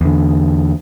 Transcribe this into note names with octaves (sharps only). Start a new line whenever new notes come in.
E2 D3